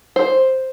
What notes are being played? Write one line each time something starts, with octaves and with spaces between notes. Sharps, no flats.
C5